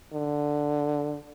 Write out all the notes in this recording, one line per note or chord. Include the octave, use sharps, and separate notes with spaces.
D3